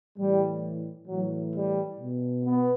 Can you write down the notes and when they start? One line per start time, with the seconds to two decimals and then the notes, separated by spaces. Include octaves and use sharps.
0.18 A2 E3 G3
1.08 A2 E3 F#3
1.54 G3
1.99 B2
2.45 B3